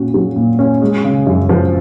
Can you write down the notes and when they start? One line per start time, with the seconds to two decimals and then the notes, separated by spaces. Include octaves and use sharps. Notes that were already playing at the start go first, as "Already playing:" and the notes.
Already playing: A#2 C#4 F#4
0.14 F#3
0.36 A#2
0.59 C#4
0.82 G#3
1.04 C#3
1.27 F#2
1.49 F3